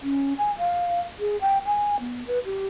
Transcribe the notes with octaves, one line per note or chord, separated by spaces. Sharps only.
C#4
G#5
F5
G#4
G5
G#5
B3
B4
G4